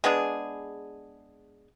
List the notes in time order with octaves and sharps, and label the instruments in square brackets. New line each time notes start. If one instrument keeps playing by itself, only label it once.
[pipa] G#3 B3 D4 G#4